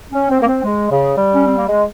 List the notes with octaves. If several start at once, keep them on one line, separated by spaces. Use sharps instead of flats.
C#4
C4
A#3
C4
G#3
C#3
G3
C#4
C4
A#3
G#3